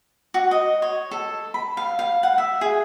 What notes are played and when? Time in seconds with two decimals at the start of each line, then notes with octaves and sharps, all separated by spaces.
0.34 F#4
0.51 D#5
0.82 C#5
1.11 A4
1.54 B5
1.77 F5
1.99 F5
2.23 F#5
2.38 E5
2.61 G#4